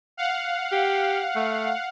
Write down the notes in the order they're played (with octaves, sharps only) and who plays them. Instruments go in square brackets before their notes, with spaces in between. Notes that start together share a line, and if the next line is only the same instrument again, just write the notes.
[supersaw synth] F5 F#5
[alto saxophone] G4
A3